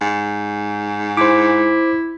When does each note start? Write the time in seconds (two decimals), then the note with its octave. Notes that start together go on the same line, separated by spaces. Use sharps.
0.01 G#2
1.17 E4 C5 D6